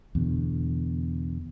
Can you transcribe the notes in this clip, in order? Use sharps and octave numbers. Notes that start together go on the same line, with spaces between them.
E2 B2 D3